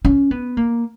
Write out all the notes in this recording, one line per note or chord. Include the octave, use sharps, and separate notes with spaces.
C#4
B3
A#3